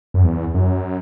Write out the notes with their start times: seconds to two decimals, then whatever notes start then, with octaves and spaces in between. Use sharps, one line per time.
0.14 F#2
0.24 E2
0.54 F#2